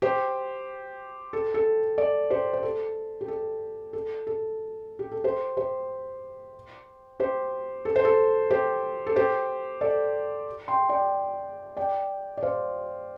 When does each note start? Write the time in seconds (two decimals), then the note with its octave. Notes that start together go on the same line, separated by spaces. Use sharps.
0.02 G4 C5
1.33 A4
1.54 A4
1.98 A4 D5
2.30 G4 C5
2.53 C5
2.63 A4
3.21 G4
3.28 A4
3.93 A4
4.27 A4
4.99 G4
5.12 A4
5.24 G4 C5
5.57 G4 C5
7.20 G4 C5
7.85 A4
7.96 C5
8.05 A4
8.50 G4 C5
9.07 A4
9.16 G4 C5
9.81 A4 D5
10.68 G5 C6
10.89 D5 G5
11.77 D5 G5
12.37 D5
12.43 C5 F5